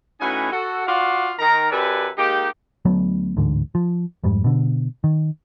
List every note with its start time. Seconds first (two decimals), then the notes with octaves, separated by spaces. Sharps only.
0.20 A2 C#4 D#4 F#4 B4 G#5
0.51 F#4 A4
0.86 F4 F#4 D5 F5
1.38 D#3 A#4 A#5
1.71 F#2 G4 A4 B4 D5 G#5
2.17 G#3 A#3 D#4 G4
2.85 D2 F#3 A3 B3
3.37 A1 D2 G#2 D3
3.75 F3
4.24 F2 G#2 G3
4.44 B2 D3
5.04 D#3